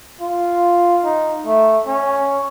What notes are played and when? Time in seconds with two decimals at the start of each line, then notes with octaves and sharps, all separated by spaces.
0.21 F4
1.04 D#4
1.46 A3
1.87 C#4